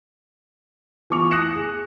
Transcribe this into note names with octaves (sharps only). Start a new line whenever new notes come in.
E3 B3 F4 C#6 D6 F7
D#6 F#6 A#6 C#7 E7
G#4